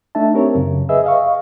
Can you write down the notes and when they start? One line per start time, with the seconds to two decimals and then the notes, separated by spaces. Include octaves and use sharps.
0.15 A3 D4 D#4 E5 A5
0.34 C4 G4 A#4 C#5
0.55 F#2 C#3
0.89 G#4 B4 D#5 E5 E6
1.04 D#5 F5 C#6